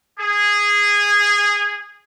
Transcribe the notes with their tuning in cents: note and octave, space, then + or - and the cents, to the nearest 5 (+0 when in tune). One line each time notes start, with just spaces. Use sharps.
G#4 -15